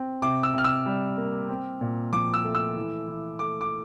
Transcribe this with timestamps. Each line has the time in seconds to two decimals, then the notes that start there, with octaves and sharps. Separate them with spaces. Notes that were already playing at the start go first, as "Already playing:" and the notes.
Already playing: C4
0.22 C3 D6
0.43 E6
0.54 C3 F6
0.64 E6
0.86 G3
1.17 A#3
1.49 C4
1.81 A#2
2.13 F3 D6
2.34 E6
2.44 A3
2.55 E6
2.76 E3
3.08 E3
3.39 A3 D6
3.61 D6